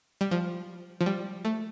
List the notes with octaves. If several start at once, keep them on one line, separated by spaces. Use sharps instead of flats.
G3
F3
F3
G3
A3